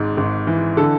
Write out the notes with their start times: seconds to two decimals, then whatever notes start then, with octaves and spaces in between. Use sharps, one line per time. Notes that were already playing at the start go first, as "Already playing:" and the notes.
Already playing: G#1 G#2
0.17 G#1
0.47 E3
0.77 D3 A4